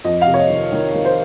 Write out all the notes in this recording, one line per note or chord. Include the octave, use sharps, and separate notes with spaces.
F2 D#5
F5
C3
C#5
D#5
D#3
D#3
D#3
C5